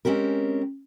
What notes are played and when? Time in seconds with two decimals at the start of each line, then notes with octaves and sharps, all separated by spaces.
0.05 G#3 C4 C#4 G4 A#4